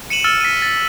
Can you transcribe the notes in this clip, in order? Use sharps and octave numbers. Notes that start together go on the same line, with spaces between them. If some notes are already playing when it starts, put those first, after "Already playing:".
C#7 D#7 E7 F#7
E6 F6 A6 C#7
B6 D#7
A6